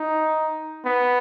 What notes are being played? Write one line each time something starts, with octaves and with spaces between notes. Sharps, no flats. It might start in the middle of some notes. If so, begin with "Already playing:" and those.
Already playing: D#4
B3